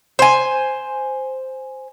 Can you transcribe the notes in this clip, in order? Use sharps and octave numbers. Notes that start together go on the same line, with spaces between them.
C5 G#5